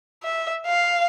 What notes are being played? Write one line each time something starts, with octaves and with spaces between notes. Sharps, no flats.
E5
F5